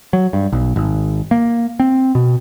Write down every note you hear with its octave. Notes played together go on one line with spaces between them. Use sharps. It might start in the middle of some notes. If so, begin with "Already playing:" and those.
F#3
G2
B1
G#1
A#3
C4
B2